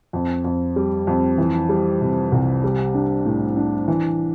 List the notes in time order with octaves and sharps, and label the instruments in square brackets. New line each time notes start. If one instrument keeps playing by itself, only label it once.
[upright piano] F2
F2
G3
F2
E3
G3
C3
C2
G3
D4
A2
D4
E3